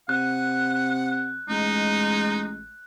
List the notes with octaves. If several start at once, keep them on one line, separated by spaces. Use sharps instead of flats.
C3 F#5 F#6
A1 G#3 D#4